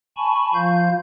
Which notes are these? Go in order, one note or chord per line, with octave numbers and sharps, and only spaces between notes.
G#5 A5 B5 C#6
F3 F4 F5 G6